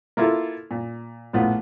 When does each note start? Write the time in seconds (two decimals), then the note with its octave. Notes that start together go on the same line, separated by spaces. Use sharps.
0.17 A#3 E4 F4 A4
0.71 A#2
1.33 A#1 A2 B3 F4